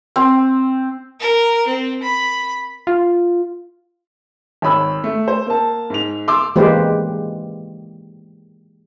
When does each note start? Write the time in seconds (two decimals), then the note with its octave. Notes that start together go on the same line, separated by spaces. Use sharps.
0.16 C4
1.20 A#4
1.67 C4
2.03 B5
2.87 F4
4.62 G#1 C#5 B5 E6
5.04 A3
5.28 C5
5.47 A#3 A5
5.90 G#2 F7
6.28 C6 D6 E6
6.56 E3 G#3 A#3 G4 B4 C5